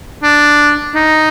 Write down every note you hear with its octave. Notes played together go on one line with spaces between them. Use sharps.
D4
D#4